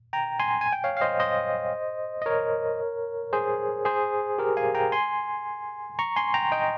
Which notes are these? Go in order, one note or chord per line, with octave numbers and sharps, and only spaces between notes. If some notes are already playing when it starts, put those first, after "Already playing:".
G5 A#5
G#5 C6
G#5
G5
C#5 F5
F5
C5 D#5
C5 D#5
D#5
A#4 C#5
G#4 C5
G#4 C5
G4 A#4
F5 G#5
G5 A#5
G#5 C6
A#5 C#6
G#5 C6
G5 A#5
D#5 G5